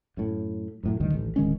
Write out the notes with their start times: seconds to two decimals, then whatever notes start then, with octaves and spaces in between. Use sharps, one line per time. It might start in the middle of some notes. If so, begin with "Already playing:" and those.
0.17 F#2 A2
0.83 F#2 A2 F#3
1.00 D2 G2 D#3
1.14 A1
1.36 D1 D#3 G#3 C#4